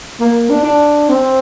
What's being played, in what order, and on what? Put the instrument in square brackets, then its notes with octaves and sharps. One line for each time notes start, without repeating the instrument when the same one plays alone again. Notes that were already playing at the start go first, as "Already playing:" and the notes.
[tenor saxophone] A#3
D4
D4
C4